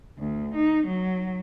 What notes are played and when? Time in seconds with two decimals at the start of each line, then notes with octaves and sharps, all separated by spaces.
0.18 D2
0.55 D#4
0.87 F#3